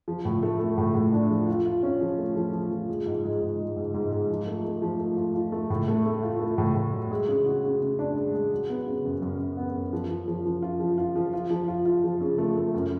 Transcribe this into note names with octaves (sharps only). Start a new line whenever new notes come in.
F3
A2
A3
A3
A2
A2
D4
F3
F4
F4
C#4
F3
A3
F3
F3
F3
G#3
G#2
G#3
G#2
G#3
G#2
G#2
G#2
F3
A3
A3
F3
A3
F4
F4
A3
A2
A3
A3
F4
A3
A2
A2
F#3
G#3
C#3
F#4
C#3
C#3
D4
G#3
G#3
F#3
B3
C#3
F#2
F#2
F#2
B3
F#2
F3
F3
F3
F3
F4
F3
F4
F3
F4
F3
F4
F4
F3
C#3
A3
A3
F#2